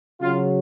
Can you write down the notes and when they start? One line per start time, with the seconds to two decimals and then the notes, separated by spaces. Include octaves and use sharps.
0.21 C#3 F#3 F4